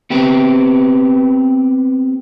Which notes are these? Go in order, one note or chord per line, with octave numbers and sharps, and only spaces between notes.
B3 C4 G4 B4